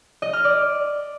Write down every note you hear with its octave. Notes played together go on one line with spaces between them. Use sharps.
D#5
F6
D5